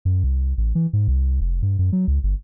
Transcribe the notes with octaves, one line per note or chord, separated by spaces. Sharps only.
F#2
C2
A1
E3
G#2
C2
F1
G2
F#2
F#3
C#2
G1